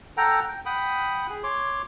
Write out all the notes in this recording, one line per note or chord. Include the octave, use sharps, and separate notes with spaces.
A4 F#5 G5 A#5
G5
F#5 G5 B5 D#6
G#4
C#5 C6 D6